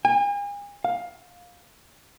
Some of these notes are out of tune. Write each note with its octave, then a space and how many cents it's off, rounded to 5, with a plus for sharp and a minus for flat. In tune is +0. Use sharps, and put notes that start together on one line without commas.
G#5 -40
F5 +15